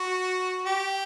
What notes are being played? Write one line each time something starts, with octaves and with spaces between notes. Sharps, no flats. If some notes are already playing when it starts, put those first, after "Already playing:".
Already playing: F#4
G4